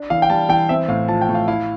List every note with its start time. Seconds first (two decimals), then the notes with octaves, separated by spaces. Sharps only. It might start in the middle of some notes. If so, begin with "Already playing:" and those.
Already playing: D4
0.10 E3 F5
0.22 G5
0.30 G3 A5
0.49 E3 G5
0.69 C4 E5
0.88 A2 F5
1.08 F3 A5
1.22 G5
1.29 A2
1.35 F5
1.47 E4 F5